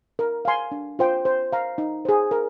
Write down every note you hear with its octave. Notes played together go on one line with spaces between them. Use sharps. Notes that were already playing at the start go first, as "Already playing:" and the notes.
A#4
F5 G#5 C6
D4
F4 C5 G5
C5
F5 A#5
D#4
G#4 C5
A#4